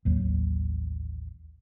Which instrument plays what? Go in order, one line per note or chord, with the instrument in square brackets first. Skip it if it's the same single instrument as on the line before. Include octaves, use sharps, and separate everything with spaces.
[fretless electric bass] A1 D#2 F#3